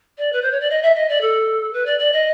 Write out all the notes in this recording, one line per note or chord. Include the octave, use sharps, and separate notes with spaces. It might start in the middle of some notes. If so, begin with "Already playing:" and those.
D5
B4
C5
C#5
D5
D#5
E5
D#5
D5
A4
B4
D5
D5
D#5